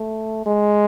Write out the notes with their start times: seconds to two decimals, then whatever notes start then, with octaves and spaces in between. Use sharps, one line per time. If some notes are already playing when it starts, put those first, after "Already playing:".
Already playing: A3
0.46 G#3